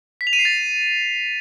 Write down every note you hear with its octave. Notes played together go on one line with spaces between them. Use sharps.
B6
F7
D#7
C7
A6